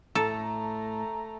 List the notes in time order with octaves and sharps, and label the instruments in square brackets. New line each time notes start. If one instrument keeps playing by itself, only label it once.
[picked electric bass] A2 [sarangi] A3 [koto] A4 [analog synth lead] A#5